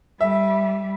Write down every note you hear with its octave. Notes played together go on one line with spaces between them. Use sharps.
G3 E5